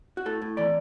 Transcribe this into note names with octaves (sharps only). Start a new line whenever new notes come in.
F#4
A2 A4
A2
E3 D5